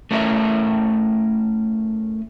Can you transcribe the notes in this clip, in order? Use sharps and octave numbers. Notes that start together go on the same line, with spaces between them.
A3 C#4 E4 A4 A#4 E5